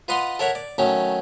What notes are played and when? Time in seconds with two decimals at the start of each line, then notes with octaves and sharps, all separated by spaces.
0.08 F4 B4 D#5 F#5 A#5 C6
0.39 A4 A#4 C#5 E5 F#5
0.55 D5
0.78 D#3 F#3 A3 C#4